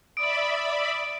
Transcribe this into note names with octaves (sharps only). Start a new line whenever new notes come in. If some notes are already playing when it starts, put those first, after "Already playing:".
D5 E5 B5 D#6 D7